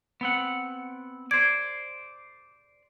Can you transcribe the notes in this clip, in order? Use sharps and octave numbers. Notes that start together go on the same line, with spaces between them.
B3 C4 F#5
C5 D5 G#6